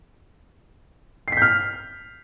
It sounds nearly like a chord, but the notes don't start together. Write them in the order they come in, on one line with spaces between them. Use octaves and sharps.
C7 B6 G6 F6